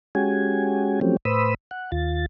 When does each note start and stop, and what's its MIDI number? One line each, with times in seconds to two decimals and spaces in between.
0.15 1.00 56
0.15 1.00 61
0.15 1.00 66
0.15 1.00 67
0.15 1.00 80
1.01 1.17 53
1.01 1.17 54
1.01 1.17 57
1.01 1.17 60
1.01 1.17 61
1.01 1.17 67
1.25 1.54 45
1.25 1.54 71
1.25 1.54 72
1.25 1.54 83
1.25 1.54 87
1.25 1.54 88
1.71 1.91 78
1.92 2.26 39
1.92 2.26 65
1.92 2.26 93